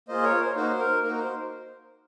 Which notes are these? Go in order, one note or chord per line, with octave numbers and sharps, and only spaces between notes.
A#3 F4 G#4 C5 D#5
A#4 C#5
C5
A#3 D#4 F#4 C5
A#4
A#3 D#4 F#4 A#4
C5